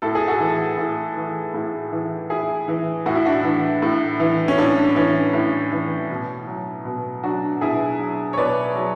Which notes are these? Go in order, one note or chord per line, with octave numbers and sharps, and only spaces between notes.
A2 A4
G#4
F#4 A4
E3
A2
E3
A2
E3
A2 E4 G#4
E3
A2 F#4
E4
D4 F#4
E3
A2
E3
C#4
A2 D4
E3 C#4
A2
E3
B2
F#3
B2
F#3 D4 F#4
B2 E4 G#4
F#3
C#5
B2 B4 D5
F#3